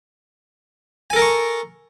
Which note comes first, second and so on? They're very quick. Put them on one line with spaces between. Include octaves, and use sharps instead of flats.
G#5 A4 A#4 A5 C#6